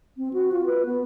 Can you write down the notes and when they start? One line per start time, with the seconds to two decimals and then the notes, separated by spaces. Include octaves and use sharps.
0.17 C4
0.33 F#4
0.52 F4
0.66 B4
0.86 B3